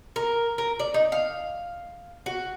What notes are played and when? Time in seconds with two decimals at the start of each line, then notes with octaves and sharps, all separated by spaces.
0.16 A#4
0.58 A#4
0.80 D5
0.94 D#4
1.12 F5
2.26 F#4